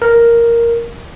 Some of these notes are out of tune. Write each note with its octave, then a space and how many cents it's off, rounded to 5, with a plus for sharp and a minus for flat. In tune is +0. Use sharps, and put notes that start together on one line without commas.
A#4 +0